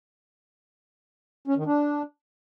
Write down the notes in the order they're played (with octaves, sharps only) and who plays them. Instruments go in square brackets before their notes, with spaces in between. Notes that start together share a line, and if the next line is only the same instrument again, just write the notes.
[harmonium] C#4
D#3
D4